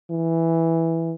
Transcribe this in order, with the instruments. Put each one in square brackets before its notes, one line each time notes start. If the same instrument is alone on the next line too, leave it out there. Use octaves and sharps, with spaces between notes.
[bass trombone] E3